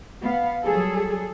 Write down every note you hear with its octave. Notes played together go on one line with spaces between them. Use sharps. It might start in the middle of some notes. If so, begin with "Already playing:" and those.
B3 F5
F#3 G3 G#4 A4